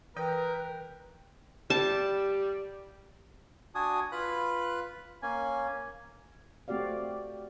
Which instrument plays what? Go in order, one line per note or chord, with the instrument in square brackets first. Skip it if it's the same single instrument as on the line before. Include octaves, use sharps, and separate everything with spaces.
[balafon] E3 [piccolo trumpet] A#4 [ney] B4 [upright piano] G5
[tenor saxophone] G3 [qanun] A5
[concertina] D4 F#4 G#5 D#6
F4 B4 B5 F#6
A#3 C#4 G#5
[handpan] A3 C4 F#4 G4 D5 F5